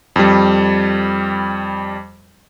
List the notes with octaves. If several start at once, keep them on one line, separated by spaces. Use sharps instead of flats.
F2 G3